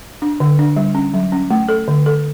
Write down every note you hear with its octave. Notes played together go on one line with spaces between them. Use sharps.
D4
D3
D4
G3
C#4
F#3
C#4
A3
A4
D3
A4